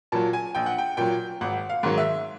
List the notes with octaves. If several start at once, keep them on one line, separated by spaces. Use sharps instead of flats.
A#2 F#3 A5
G#5
A#1 G5
F#5
G5
A#2 F#3 G5
G#1 F#5
F5
G#2 D#3 F#3
E5